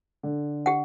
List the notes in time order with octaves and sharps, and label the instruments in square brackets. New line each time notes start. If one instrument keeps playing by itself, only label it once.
[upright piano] D3
[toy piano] G4 F#5